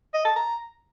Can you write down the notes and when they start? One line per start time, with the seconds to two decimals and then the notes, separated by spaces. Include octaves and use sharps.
0.14 D#5
0.25 A5
0.36 A#5